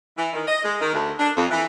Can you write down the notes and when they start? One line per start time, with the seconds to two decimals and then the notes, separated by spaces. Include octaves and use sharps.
0.17 E3
0.33 D#3
0.47 D#5
0.63 G#3
0.80 D#3
0.92 D2
1.18 D4
1.35 F2
1.50 E3